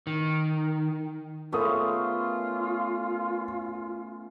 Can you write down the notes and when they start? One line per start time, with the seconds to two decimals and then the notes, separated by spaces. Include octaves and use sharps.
0.07 D#3
1.52 A3 B3 C#4 F4 A4 A#4 D#6